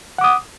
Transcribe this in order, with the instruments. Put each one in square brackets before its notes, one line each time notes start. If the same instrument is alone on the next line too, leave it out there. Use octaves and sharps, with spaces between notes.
[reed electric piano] F#5
D6
D#6